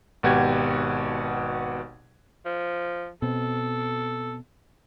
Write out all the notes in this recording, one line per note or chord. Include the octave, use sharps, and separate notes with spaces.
G#1 B2 F#4 G4 G#6
F3
B2 C4 A4